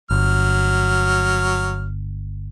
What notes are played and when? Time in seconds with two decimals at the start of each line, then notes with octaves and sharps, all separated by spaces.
0.11 G1 F#3 F6